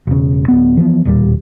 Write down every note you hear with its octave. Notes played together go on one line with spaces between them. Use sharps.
E1 C#3
D1 B3
E3 F3 A#3 B3
E1 D#2 A#2 G3